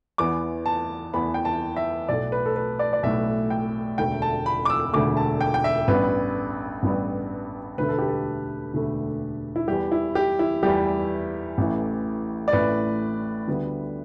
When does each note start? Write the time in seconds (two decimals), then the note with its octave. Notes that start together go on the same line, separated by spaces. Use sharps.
0.18 E2 E3 B3 D6
0.66 A5
1.14 E2 E3 B3 B5
1.34 G5
1.45 A5
1.77 E5
2.09 B1 A2 A3 D5
2.32 B4
2.46 A4
2.56 B4
2.79 D5
2.93 D5
3.03 B1 A2 A3 E5
3.50 G5
3.98 E1 D2 D3 A3 G5
4.22 A5
4.46 B5
4.65 D6
4.70 E6
4.93 E1 D2 D3 A3 D6
5.17 A5
5.41 G5
5.54 G5
5.64 E5
5.88 A1 G2 G3 B3 B4
6.83 A1 G2 G3 B3
7.78 E1 D2 D3 A3 B4
7.88 A4
7.98 G4
8.08 A4
8.73 E1 D2 D3 A3
9.56 E4
9.68 E2 E3 G3 G4
9.92 E4
10.15 G4
10.39 E4
10.63 E2 E3 G3 G4
11.58 A1 A2 E3
12.48 D5
12.52 A1 A2 E3 B4
13.48 D2 D3 G3 B3